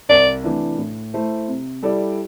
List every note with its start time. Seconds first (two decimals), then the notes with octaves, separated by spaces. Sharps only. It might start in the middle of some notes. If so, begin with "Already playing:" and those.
0.09 C2 D5
0.44 C3 E3 A3 D4
0.78 A2
1.14 A3 E4 C5
1.48 C3
1.83 G3 E4 A4 D5